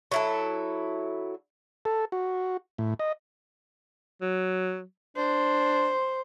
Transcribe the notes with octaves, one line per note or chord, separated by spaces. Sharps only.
F#3 E4 A4
A4
F#4
A2
D#5
F#3
D4 C5